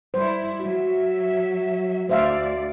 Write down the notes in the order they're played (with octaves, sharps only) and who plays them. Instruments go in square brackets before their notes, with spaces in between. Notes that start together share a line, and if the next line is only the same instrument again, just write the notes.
[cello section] G3 E4 [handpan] C5
[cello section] F#3 E5 [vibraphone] F#4
[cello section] D2 D5 [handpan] C5 E5 F5